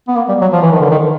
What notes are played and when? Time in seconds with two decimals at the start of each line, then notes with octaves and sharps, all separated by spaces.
0.08 B3
0.16 A#3
0.29 G3
0.41 F#3
0.53 F3
0.62 E3
0.72 D#3
0.81 D3
0.90 D#3